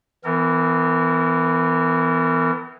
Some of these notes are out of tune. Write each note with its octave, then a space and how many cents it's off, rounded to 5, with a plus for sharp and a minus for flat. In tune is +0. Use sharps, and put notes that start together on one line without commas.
E3 +0 B3 +40 A#4 -30